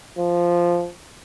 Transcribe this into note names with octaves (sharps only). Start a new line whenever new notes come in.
F3